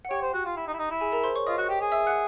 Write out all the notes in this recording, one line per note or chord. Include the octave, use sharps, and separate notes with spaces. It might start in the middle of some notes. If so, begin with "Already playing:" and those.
F#5
G4 C#5 G5
C5
F#4
F4
E4
D#4
E4
D#4
E4
G#4 G#5
A#4 A#5
C5 C6
C#5 C#6
F4 D#5 D#6
F#4
G4
G#4
E5 E6
F#5 F#6